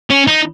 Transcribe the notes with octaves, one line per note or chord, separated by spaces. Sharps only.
C#4
D#4